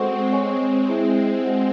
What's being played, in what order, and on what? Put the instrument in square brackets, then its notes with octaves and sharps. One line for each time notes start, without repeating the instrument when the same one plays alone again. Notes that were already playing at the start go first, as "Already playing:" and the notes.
Already playing: [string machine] G#3 C4 [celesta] F#4 A4 C5 F#5 C#6
[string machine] G#3 C4 [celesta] C#5 G#5 C#6
[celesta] E4 G#4 C5 E5
F#4 C5 D#5 F#5